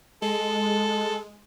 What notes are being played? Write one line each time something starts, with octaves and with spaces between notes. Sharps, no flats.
G#3 A4